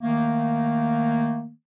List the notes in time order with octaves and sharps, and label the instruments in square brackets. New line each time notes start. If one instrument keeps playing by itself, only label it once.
[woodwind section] D#3 A3 A#3